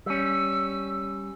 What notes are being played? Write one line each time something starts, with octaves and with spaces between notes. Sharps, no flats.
G3 C#4 E6